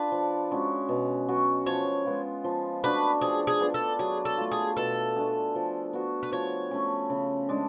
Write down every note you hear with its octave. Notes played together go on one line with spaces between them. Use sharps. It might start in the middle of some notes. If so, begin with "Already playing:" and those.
Already playing: D4 F4 B4
F3
G#3 C#4 F#4
B2
F#3 B3 F#4
F3 C#5
G#3 B3 F4
F3
A3 D4 F#4 B4
F3 G#4
G#4
B3 D4 F4
A4
F#3 G#4
A4
A3 F4
G#4
B2 A4
A3 D4 G#4
F3
B3 F#4
B4
F3 C#5
A3 C#4
C#3
G#3 D4